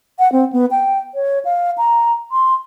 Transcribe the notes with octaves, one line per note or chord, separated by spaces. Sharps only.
F#5
C4
B3
G5
C#5
F5
A#5
C6